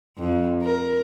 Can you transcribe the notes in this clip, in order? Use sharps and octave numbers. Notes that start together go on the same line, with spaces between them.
F2
A#4